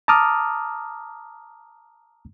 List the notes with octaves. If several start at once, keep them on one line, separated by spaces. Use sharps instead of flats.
A5 A#5 D6 D#6 F6